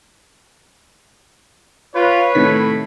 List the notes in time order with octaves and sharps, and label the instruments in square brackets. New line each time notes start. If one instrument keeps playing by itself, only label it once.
[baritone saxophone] F4 [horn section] B4 C#5
[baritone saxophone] A2 [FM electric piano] C3 D#3 B6